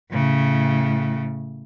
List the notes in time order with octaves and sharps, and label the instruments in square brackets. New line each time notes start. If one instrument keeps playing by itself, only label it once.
[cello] A2 C#3